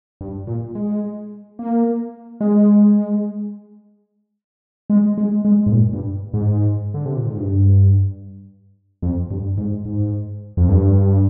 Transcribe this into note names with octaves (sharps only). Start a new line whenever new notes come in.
G2
A#2
G#3
A#3
G#3
G#3
G#3
G#3
G#2
A#2
G2
G#2
D3
C3
A#2
G#2
G2
F2
G2
G#2
G#2
F2
G2